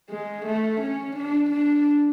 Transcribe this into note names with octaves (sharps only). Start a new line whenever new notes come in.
G#3
A3
C#4
D4
D4